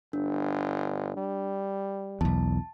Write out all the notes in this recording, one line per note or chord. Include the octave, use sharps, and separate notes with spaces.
G1 D4
G3
B1 E2 A5